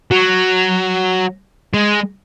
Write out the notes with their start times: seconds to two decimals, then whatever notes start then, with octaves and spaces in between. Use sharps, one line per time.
0.11 F#3
1.74 G#3